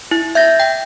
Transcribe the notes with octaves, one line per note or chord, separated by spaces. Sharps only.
E4
E5 G6 A#6
G5